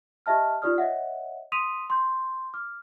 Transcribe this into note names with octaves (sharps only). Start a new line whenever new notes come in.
G4 D#5 E5 A5 F6
D#4 F4 G4 D5 D#6 F6
C#5 D#5 E5 F#5
C6 D#6 B6 D#7 F7
C6 G6
D6 F6